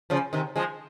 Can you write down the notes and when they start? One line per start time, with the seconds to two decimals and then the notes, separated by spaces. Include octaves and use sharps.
0.10 C#3 F3
0.33 C3 D#3
0.56 F3 G#3